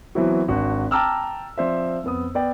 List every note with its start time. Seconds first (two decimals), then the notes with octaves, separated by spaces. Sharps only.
0.15 E3 F#3 B3 C4 E4 F#4
0.48 G#1 D4 F#4
0.91 G5 A5 A#5 D6 E6 F6
1.58 F3 C4 C5 D5 E5
2.04 F2 B3 D#6
2.35 B3 D5 G5